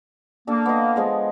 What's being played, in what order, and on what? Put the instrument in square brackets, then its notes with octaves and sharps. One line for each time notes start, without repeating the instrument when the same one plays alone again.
[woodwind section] A#3 [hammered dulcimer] D4 A4
[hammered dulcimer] B3 D#5
F3 G#3 F4